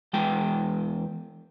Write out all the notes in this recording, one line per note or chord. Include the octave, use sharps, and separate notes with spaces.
E2 G#3 G5